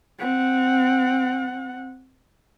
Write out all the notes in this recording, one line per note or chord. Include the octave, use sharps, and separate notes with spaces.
C4 F#5